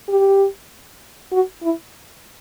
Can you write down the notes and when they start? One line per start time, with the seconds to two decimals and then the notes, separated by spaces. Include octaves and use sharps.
0.09 G4
1.32 F#4
1.63 E4